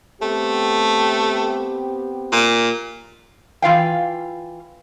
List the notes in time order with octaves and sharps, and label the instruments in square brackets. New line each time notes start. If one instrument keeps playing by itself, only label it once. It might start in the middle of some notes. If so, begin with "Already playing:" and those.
[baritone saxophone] A3 [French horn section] B3 C4 G4
[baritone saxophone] A#2
[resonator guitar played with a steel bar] E3 F4 F5 G5